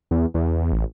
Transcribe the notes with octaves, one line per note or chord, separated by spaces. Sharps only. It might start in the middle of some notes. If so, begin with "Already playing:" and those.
E2
E2
A1